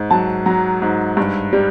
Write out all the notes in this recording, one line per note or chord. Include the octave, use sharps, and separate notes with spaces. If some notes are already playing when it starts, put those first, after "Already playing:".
Already playing: G#2
F#3 A5
F#3 A#5
G#2
G2
G3